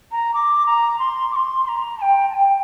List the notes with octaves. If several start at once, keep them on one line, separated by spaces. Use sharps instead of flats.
A#5
D6
A#5
C6
D6
C6
C6
A#5
A5
G5
A5
G5